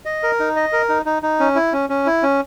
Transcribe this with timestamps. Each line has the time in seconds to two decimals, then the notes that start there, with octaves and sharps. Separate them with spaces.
0.05 D#5
0.23 A#4
0.40 D#4
0.56 D#5
0.73 A#4
0.89 D#4
1.06 D#4
1.23 D#4
1.40 C#4
1.55 E4
1.73 C#4
1.90 C#4
2.06 E4
2.23 C#4